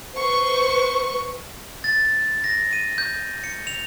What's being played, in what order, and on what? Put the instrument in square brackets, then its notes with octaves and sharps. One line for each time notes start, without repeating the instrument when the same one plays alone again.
[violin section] B4 C5 C#6
[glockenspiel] A6
A#6
D#7
G6
C#7
F7